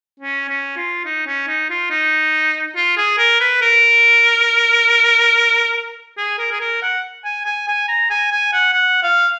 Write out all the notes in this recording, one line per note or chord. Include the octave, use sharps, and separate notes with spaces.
C#4
C#4
F4
D#4
C#4
D#4
F4
D#4
F4
G#4
A#4
B4
A#4
G#4
A#4
G#4
A#4
F#5
G#5
G#5
G#5
A#5
G#5
G#5
F#5
F#5
F5